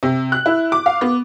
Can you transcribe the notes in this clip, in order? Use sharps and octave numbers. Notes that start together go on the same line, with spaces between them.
C3
F#6
E4
D6
F5
B3